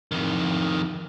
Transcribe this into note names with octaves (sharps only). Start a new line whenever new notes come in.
F2 D#3